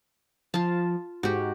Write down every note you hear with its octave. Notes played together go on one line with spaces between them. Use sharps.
F3 F4 A5
G#2 F#4 G4